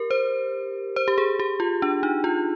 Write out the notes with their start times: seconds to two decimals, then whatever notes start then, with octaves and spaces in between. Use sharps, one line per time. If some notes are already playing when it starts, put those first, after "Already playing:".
Already playing: G4 A#4
0.11 C5
0.96 C5
1.08 G4
1.18 G#4
1.40 G4
1.60 F4
1.82 D4
2.03 D#4
2.24 F4